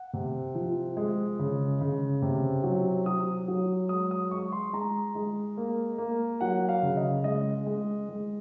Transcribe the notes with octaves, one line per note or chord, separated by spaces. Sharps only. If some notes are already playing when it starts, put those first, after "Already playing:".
Already playing: F#5
C3
F3
G#3
C#3
C#3
C3
F#3
F#3 D#6
F#3
G#3 D#6
D#6
G#3 C#6
C6
G#3 A#5
G#3
A#3
A#3
F#3 F#5
F5
C#3
D#5
G#3 D#5
G#3
G#3